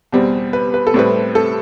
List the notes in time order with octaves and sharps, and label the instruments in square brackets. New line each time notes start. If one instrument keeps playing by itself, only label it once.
[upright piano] E2 B2 G3 C4
B4
B4
A4
A2 G3 C4 B4
A4